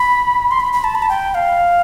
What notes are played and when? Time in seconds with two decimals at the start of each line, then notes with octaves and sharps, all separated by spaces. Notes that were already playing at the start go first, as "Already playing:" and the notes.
Already playing: B5
0.51 C6
0.60 B5
0.73 B5
0.84 A5
0.95 B5
1.02 A5
1.09 G5
1.35 F5